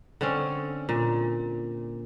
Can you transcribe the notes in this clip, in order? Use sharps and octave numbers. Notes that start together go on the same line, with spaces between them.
D3 C4 C#4
A#2